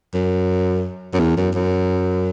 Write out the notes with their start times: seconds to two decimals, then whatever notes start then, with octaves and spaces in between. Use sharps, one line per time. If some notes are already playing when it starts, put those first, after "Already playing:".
0.14 F#2
1.14 F#2
1.20 E2
1.37 F#2
1.55 F#2